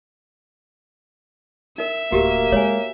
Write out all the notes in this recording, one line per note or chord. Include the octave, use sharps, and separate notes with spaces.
D#4 A#4 E5
D1 A#3 F#4 G4 A#4
G#3 C#5 G#5